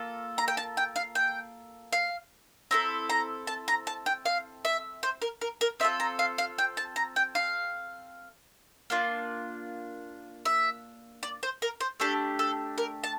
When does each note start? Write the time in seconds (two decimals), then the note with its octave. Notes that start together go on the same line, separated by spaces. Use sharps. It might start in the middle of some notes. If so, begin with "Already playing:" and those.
Already playing: A#3 F4 A4
0.38 A#5
0.48 G5
0.57 A5
0.77 G5
0.96 F5
1.15 G5
1.93 F5
2.71 C4 E4 A4 A#5
3.09 A#5
3.47 A5
3.68 A#5
3.87 A5
4.06 G5
4.25 F5
4.65 E5
5.03 C5
5.22 A#4
5.41 A#4
5.61 A#4
5.80 C4 F4 A4 E5
6.00 A#5
6.19 F5
6.38 F5
6.58 G5
6.77 A5
6.96 A#5
7.16 G5
7.35 F5
8.90 A#3 D4 F4
10.45 E5
11.23 D5
11.43 C5
11.62 A#4
11.81 C5
12.00 A3 D4 G4 A4
12.39 A4
12.78 A#4
13.04 A5